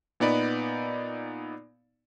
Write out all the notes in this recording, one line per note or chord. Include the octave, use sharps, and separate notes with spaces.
A#2 B3 D#4 D5 B5